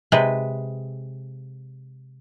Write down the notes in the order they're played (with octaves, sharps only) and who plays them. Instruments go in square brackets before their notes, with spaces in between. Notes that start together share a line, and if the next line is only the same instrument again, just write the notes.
[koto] C3 G#3 B4